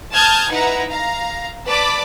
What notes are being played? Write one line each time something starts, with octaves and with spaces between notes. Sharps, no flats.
A5 D#6 F6 G6 G#6
D#4 E4 B4 F#5 A#5
F5 A#5
B4 D5 A5 B5 D6